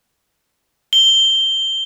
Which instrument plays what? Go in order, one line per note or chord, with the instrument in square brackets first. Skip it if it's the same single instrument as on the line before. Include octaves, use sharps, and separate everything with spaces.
[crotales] G7